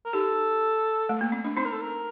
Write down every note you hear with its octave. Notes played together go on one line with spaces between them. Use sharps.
A#4
D#4 G4 A4
A3
A#3
C4
D4
C4 D#4 C5
A#4
A4
A#4